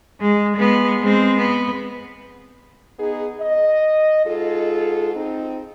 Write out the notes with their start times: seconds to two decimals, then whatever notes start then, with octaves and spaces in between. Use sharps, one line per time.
0.21 G#3
0.57 G#3 B3
1.01 G#3 C4
1.38 B3
2.99 B3 D#4 G#4
3.40 D#5
4.25 G#2 F4 G#4 A4
5.15 C4 D#4